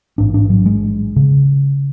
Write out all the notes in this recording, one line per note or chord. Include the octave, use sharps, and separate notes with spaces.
A1 G#2 D4
D4
F#3
G#3
C#3